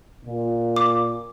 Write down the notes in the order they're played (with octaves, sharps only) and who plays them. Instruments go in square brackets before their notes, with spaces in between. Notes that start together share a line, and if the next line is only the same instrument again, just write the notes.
[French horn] A#2
[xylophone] D6